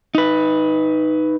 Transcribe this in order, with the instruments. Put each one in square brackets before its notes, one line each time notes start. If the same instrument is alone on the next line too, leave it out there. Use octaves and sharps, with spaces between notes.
[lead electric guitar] D#4 B4